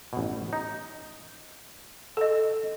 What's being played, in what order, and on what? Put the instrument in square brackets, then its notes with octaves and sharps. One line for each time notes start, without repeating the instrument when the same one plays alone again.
[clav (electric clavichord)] A1 B2
D#4
[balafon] A4 D#5